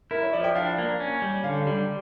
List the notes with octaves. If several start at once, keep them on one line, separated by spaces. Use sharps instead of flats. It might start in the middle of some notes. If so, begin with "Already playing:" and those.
E4 A#4
C#5
F3 D5
G5
D4 F5
A#3
C#4
G3
D3 F5
G3